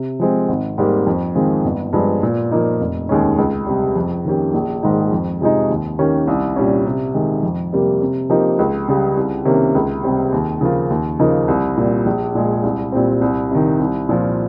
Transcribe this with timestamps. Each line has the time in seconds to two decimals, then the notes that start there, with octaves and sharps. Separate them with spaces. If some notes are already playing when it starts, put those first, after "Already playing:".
Already playing: C3
0.20 F3 G#3 C4
0.49 G#1
0.78 G#2 G3 A#3
1.07 F2
1.35 D#3 G#3 C4 F4
1.65 G1
1.93 G2 F3 G#3
2.23 A#2
2.51 F3 A#3 D#4
2.80 F1
3.09 D#2 D#3 G#3 C#4
3.38 C#2
3.66 C3 G3
3.96 F2
4.25 D#3 A#3 C#4 G4
4.54 A#1
4.83 G#2 D#3 G#3 D#4
5.11 F2
5.41 C3 F3 G#3 D#4
5.69 D#2
5.99 D#3 A#3 C#4 G4
6.28 C2
6.56 A#2 G3 C#4
6.85 C3
7.14 D#3 G#3
7.43 F2
7.73 C3 G3 A#3
8.01 C3
8.30 F3 A#3 D#4 G4
8.59 C#2
8.88 C#3 G3
9.17 C2
9.45 C3 D#3 A#3 C#4
9.75 C#2
10.03 C3 G3 C4 G4
10.32 D#2
10.61 C#3 F3 A#3 F4
10.90 D#2
11.19 C#3 F3 A#3 D#4
11.48 C2
11.77 A#2 G3 A#3
12.06 A#1
12.35 A#2 G#3
12.63 C2
12.92 A#2 G3 C4
13.21 C2
13.51 C3 D#3
13.79 C2
14.09 A#2 F3